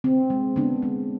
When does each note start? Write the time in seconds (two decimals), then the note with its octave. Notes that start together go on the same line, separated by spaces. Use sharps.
0.04 D3 C4
0.30 G#3
0.56 D3 B3 D4
0.83 G#3